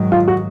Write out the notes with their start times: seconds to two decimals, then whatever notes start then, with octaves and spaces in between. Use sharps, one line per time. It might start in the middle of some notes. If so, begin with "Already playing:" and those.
Already playing: G#2 D#3 F#3
0.12 F4
0.28 F#4